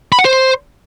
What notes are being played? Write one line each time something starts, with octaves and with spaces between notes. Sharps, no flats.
B5
F#5
C5